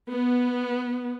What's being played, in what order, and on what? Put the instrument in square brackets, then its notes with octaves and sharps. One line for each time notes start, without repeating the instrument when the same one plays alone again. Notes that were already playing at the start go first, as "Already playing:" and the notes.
[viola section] B3